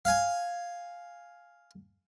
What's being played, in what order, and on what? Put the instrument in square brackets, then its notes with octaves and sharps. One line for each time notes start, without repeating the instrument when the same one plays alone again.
[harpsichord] F5 G#5